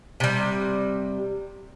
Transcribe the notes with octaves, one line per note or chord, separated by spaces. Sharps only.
C3 G3